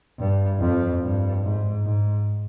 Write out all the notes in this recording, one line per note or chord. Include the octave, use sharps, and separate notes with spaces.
G2
F2
G2
G#2
G#2